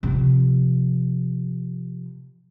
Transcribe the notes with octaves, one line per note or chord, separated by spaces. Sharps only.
C3 F3